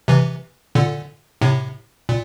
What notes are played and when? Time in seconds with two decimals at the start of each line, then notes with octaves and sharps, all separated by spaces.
0.08 C3 E3
0.75 A#2 D3
1.41 A2 C3
2.09 A#2